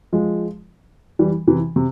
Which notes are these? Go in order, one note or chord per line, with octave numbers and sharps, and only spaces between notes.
F3 G#3
E3 G3
C3 E3
C3